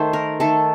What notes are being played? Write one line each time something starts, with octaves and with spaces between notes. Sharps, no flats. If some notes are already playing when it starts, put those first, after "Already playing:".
Already playing: D#3 A3 C5
A#4
D#3 A3 A4